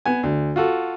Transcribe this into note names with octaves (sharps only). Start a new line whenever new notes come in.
B3 G#5
D2
F4 F#4 A4